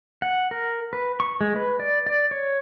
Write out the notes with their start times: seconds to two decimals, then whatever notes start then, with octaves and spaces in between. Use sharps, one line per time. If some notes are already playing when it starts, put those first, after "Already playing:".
0.22 F#5
0.51 A#4
0.93 B4
1.20 C#6
1.41 G#3
1.56 B4
1.80 D5
2.07 D5
2.31 C#5